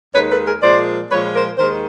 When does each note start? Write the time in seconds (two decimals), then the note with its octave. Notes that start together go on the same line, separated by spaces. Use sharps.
0.13 D#2 D#3 G#3 B4 C#5
0.30 A4 B4
0.46 G#4 A#4
0.61 A#2 F3 G#3 C5 D5
1.10 A#2 F3 G#3 B4 C#5
1.34 A#4 C5
1.58 D#2 D#3 G#3 A#4 C5